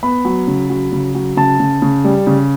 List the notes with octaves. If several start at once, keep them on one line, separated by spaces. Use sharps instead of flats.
B3 B5
F#3
C#3
F#3
C#3
F#3
C#3 A5
C#3
C#3
G3
C#3